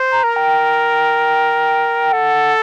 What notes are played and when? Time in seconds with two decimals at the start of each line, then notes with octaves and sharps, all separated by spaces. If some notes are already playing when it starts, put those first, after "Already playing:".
Already playing: C5
0.11 A#5
0.24 A#4
0.36 G5
2.13 A4 F#5